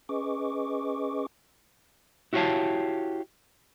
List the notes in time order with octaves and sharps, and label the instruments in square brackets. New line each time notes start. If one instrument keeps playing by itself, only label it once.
[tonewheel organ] C#4 G#4 B4 D#5 C#6 D6
[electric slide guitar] E4 F#4 G4 C#5 F5 A5